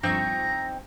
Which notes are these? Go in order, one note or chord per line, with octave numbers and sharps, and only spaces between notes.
G2 F3 C4 D#4 A#5 C#6 G6